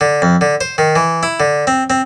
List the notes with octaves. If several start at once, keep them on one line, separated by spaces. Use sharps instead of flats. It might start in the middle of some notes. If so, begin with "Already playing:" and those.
D3
F2
D3
C5
D#3
E3
E4
D3
C4
C4